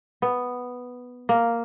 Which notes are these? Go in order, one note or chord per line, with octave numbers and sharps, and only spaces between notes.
B3
A#3